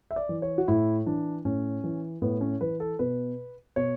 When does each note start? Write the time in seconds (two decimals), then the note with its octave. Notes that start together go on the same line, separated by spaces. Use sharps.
0.11 E5
0.16 D5
0.29 E3
0.42 C#5
0.58 F#4
0.68 A2 E4
1.06 E3 D4
1.45 A2 C#4
1.84 E3
2.22 A2 B3
2.41 C#4
2.61 E3 B4
2.80 A4
2.99 B2 B4
3.76 B2 C#5